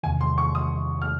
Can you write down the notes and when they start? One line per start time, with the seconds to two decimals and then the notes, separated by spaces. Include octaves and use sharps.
0.03 E2 C3 D#3 G#5
0.21 C6
0.38 C#6
0.55 D#6
1.02 F6